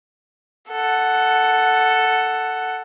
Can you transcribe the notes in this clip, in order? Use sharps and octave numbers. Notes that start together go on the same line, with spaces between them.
A4 F#5